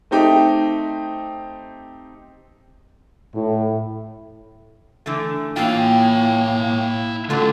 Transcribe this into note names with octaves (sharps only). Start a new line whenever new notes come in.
A3 C4 D#4 G4
A2
D3 E3 A3
A2 E3 A#3 E4 F4 G5
D3 F#3 G#3 A3 C#4 F4